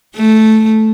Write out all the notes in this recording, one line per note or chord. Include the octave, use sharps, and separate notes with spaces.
A3